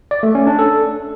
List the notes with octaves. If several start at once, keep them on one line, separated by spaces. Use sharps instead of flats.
D5
A3
C#4
D4
A4